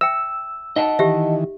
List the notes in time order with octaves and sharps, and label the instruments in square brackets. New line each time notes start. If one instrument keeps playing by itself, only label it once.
[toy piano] E5 G5 [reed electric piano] E6
[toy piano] D#4 [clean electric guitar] D#5 F#5 A5
[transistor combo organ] D#3 E3 [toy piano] G4 E5